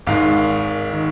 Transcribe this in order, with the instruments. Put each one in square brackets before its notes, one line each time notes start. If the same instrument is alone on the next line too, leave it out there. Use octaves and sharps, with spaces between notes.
[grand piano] G#1 G#2 D#3 F5
D#3